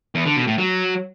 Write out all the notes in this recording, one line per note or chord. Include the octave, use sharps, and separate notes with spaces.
E2
D3
B2
A2
F#3